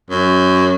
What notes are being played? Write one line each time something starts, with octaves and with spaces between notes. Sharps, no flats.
F#2